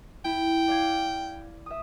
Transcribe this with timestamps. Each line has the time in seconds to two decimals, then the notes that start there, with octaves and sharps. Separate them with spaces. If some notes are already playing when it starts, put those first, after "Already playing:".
0.25 E4 G5
0.68 D5 F5 G#6
1.66 E5 D#6